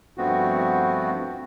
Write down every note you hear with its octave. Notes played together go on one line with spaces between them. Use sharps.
G2 F3 A3 B3 C4 F#4